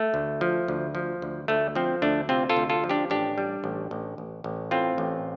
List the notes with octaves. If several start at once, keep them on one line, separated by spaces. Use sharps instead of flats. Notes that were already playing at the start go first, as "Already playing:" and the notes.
Already playing: A3
D2
F3
D2
F3
D2
D2 A3
F3 C4
D2 A3 D4
C3 C4 F4
F4 A4
D2
F4 A4
F3
D4 G4
A1 D4 G4
G3
A1
A1
A1
A1
A2 C4 F4
A1